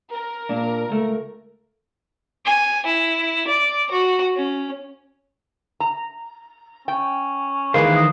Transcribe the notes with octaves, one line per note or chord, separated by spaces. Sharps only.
A#4
A#2 D4
C#2 A3
G#5
E4
D5
F#4
C#4
A#5
C#4 G5
D#3 E3 G#3 A#3 B4 C5
D#5